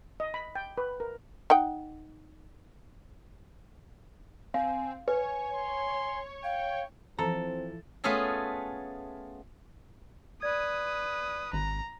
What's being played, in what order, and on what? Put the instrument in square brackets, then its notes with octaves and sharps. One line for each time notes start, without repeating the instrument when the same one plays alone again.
[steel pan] D#5
B5
G5
B4
A#4
[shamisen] D#4 F#5 G5
[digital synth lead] C4 [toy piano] F5 [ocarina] G#5
[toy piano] B4 [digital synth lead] C#5 [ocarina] G#5
[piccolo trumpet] C6
[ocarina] F5 [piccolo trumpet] G5
[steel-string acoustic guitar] E3 F3 [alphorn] C4 [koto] A4 [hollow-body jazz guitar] A#5
[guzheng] A3 B3 C#4 F4 G#4 A4
[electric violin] B4 D#6 [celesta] D5 G#6
[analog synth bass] G#1 [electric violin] A#5